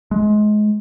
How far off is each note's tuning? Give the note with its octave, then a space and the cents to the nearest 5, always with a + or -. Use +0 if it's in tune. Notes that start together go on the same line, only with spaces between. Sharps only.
G#3 +25